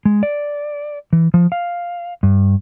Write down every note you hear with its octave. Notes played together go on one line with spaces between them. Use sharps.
G#3
D5
E3
F3
F5
G2